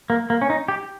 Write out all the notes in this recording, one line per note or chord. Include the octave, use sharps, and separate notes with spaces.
A#3
A#3
C#4
D#4
G4